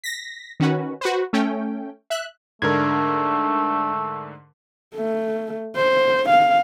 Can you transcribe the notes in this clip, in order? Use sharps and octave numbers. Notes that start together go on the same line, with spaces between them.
A#6 B6
D#3 C#4 F#4 B4
F#4 B4 C5
A3 C#4 G5
E5 F#6
G#2 D3 A3 D4 A#4 G#6
A3
C5
F5